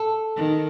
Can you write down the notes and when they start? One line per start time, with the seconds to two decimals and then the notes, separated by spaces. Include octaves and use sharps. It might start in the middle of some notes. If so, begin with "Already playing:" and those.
Already playing: A4
0.36 D#3